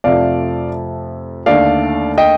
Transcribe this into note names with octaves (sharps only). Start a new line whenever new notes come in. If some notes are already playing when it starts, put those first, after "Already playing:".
F2 C3 F3 A3 D5 F5
D#2 D3 A3 D5 F5
D#5 G5